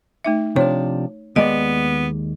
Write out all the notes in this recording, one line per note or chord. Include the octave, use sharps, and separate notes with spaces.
A3 D#4 E5
C3 F3 D4 C#5
D#2 G#3 B3 D5 D#5